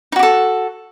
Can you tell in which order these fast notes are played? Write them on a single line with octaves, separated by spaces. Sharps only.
D#4 F#4 G4 A4